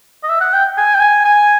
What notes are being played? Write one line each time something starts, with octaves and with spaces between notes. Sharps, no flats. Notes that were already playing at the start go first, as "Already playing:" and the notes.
D#5
E5
F#5
G5
G#5
G5
G#5
G#5